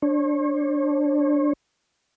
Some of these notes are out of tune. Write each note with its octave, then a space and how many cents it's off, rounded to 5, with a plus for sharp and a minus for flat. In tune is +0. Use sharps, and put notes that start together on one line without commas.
D4 +0 C#5 -40